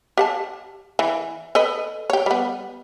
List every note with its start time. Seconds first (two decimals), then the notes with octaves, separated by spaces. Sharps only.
0.17 G4 F#5 A5
0.99 E3
1.55 A4 B4 D#5
2.10 G4 C#5
2.26 G3 B3